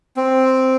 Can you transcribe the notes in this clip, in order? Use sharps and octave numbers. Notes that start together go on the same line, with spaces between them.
C4